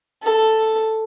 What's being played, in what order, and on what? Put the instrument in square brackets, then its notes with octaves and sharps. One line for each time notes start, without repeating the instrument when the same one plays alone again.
[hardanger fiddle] A4